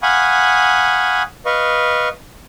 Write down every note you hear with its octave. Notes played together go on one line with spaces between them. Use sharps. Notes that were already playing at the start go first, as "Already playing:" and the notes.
F5 F#5 G#5 B5 C#6 D#6
B4 D#5 F5 C#6